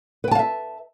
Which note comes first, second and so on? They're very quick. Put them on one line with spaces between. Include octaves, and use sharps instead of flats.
B4 G5 A5 F5 E5